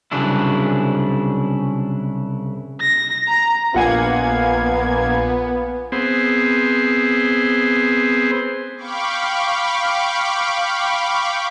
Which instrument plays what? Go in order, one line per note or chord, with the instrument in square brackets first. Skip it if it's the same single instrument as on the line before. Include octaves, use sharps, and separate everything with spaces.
[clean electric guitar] C2 C#3 F#3 D4 E4
[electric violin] A#6
A#5
[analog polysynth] A#1 A#3 G#6 [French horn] B3 [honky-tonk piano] F4 F#5 G#5 [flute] F5
[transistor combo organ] B3 C4 G#4 C5
[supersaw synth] F5 G5 B5 C#6 D6